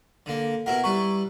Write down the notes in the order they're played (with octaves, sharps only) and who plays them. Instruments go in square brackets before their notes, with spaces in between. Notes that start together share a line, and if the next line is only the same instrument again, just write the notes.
[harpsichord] D3 A#3
[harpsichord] B2 E4 A#4 [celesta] F#5
[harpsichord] G3 E4 B4 [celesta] A#5 C#6